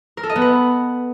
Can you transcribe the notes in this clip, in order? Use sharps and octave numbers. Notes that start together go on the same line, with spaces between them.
A#4
A4
D#5
B3
B4